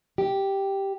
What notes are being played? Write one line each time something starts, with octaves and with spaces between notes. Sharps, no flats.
G4